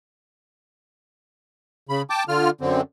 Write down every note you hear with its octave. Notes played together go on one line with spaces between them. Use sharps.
C#3 B5
G5 A5 D6
D3 F4 F6
F#2 D3 C4